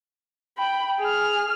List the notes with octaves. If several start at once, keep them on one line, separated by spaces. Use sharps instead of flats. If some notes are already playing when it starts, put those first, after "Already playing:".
G5 B5
G#4 F6